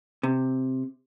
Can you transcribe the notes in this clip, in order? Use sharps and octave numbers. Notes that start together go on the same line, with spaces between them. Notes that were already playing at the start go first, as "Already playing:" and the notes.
C3